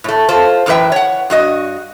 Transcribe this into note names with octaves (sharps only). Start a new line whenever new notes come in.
A2 A3
F4 A4 C5
F#2 A2 E3 B4 E5 G5
C#5 F#5
G2 F#4 D#5